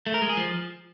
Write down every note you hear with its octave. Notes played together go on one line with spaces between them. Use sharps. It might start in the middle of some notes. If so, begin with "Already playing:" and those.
A3
A#4
G#3
G#4
F3